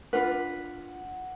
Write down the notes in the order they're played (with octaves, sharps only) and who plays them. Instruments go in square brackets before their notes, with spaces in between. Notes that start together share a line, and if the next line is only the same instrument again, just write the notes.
[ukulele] D4 F4 B4 [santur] F#5